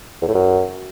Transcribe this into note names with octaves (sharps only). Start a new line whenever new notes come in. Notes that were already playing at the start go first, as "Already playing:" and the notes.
E2
A2
F#2